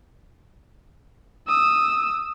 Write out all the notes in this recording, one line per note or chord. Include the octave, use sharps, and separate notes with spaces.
D#6 E6